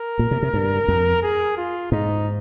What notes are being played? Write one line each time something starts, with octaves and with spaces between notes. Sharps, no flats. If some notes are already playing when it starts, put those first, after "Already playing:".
Already playing: A#4
A#2
C3
C3
G2
F2
G#4
F4
G#2 D#4